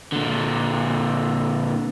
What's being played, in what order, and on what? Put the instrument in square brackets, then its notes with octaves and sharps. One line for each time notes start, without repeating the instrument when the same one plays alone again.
[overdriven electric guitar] A#2 D3